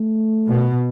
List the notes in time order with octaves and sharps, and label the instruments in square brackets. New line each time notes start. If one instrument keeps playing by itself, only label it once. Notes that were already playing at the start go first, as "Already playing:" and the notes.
Already playing: [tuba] A3
[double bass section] B2